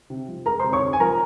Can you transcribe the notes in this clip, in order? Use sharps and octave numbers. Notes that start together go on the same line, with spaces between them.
C3
F3
G#3 A#4 A#5
C5 C6
C3
C#5 C#6
C3
G#5
F3 A#4 A#5